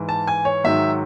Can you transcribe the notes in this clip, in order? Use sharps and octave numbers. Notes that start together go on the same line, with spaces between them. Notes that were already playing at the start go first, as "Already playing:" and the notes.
Already playing: G#2 E3
A5
G#5
C#5
G#2 D#3 F#3 E5